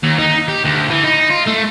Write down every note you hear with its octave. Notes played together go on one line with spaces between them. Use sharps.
D#2
D#4
G4
D2
E3
D#4
F4
A3